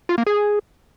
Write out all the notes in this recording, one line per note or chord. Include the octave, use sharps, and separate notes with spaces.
F4
A#3
G#4